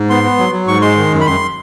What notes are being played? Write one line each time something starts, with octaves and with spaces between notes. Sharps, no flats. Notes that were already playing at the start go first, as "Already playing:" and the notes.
Already playing: G#2
B3 C6
B3
F#3
F#3
G#2 C#6
G#3 C6
D#3
F#2
B5
F#2 C6